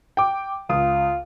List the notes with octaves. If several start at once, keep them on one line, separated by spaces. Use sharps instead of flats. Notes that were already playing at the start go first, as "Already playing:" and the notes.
G5 D6
C#2 F4 D#6